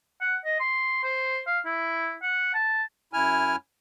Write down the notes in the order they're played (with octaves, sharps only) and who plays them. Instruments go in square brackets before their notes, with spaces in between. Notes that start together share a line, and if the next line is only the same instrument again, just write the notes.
[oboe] F#5
D#5
C6
C5
F5
E4
F#5
A5
[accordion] F#2 E4 G#5 F6